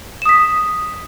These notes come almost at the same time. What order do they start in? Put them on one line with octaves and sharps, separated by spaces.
E7 D#6 B6